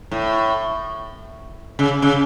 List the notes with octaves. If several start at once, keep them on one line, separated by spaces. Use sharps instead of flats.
A2
C#3
C#3